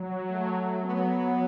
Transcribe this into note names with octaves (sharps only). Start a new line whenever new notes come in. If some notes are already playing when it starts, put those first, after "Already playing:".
Already playing: F#3
A3
B3